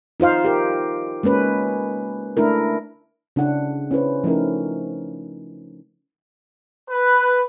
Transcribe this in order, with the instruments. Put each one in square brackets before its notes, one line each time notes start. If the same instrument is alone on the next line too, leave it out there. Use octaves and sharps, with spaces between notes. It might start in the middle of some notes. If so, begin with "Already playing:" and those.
[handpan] D#4 F4 C5 F5
G4 A#4
G#3 A#3 C#4 B4
A3 D4 E4 A#4
C#3 D4 E4 F#5
C#4 E4 B4 C5
F3 A3 C#4 D#4 E4 A#4
[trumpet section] B4